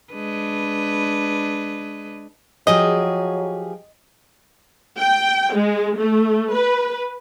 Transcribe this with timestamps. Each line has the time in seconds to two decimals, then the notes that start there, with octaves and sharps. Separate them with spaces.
0.13 G#3 D4 B4
2.67 F3 F#3 G4 G#4 D#5
4.98 G5
5.55 G#3
5.98 A3
6.53 B4